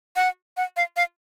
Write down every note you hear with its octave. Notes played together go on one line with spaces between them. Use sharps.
F#5
F#5
F5
F5